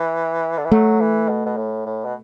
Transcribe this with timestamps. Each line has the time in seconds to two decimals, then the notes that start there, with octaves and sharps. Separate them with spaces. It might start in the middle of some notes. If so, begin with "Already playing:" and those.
Already playing: E3
0.57 D3
0.65 E3
0.72 F#3 A3
1.00 E3
1.29 B2
1.46 B2
1.57 A2
1.86 A2
2.05 B2